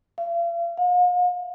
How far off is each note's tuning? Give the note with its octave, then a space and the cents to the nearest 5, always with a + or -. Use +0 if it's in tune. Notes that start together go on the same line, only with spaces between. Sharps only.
F5 -40
F5 +45